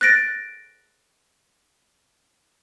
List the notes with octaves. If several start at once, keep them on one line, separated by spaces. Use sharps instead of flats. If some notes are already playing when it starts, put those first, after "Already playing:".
F#6 A6 A#6 D7